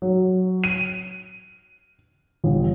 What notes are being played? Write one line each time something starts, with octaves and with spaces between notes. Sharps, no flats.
F#3
D#7
G1